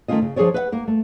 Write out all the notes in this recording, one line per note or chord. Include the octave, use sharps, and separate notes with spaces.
D#3 A3 A#3 C#4 F4 D#5
C#3
F3 D4 G#4 A#4 C#5 D5
B4 E5 F#5
A#3 A#4
A3